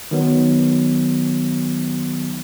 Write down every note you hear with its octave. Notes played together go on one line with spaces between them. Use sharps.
D#3 F#3 B3